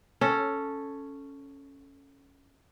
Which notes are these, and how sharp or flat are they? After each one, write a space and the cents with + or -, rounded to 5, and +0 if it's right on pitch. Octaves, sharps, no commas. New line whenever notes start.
C#4 +0 A4 +0